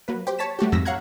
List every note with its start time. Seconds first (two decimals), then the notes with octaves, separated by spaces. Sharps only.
0.08 F#3 A#3 B4
0.27 G4 C5
0.39 C#5 A5 B6 E7
0.59 G3 A3 F#4 G4
0.72 F2 G#2 E6 A#6 B6
0.85 C#5 F5 F#5 A#5 F#6 G#6